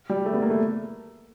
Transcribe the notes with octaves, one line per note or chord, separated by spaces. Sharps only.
G3
A3
B3
A#3
A3